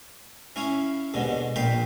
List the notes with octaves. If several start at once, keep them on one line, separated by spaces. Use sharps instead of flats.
C#4 E4 C#5 F5
D#2 G#2 B2 D3
A#1 A#2 F5 G5 B5 C6